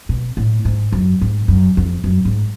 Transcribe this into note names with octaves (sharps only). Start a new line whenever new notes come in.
B2
A2
G#2
F#2
G#2
F#2
F2
F#2
G#2